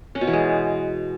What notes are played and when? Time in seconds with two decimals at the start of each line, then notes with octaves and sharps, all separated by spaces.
0.15 C#4
0.21 B2
0.27 E3
0.33 G#3